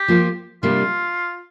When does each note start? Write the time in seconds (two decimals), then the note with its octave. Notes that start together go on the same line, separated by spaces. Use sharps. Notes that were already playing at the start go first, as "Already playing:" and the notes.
Already playing: G4
0.08 F3 A#3 F4
0.63 C3 G3 A#3 D4 F4